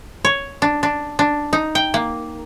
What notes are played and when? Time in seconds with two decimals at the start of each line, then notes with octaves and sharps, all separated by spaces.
0.25 C#5
0.62 D4
0.83 D4
1.19 D4
1.53 D#4
1.75 G5
1.94 A#3